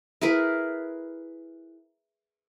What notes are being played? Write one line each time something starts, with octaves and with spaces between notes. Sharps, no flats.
E4 G#4 A#4 B4